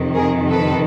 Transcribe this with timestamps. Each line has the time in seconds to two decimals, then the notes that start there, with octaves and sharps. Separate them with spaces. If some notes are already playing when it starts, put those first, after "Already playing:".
Already playing: F2 C3 D#3
0.14 G#4 A#4
0.50 A4 B4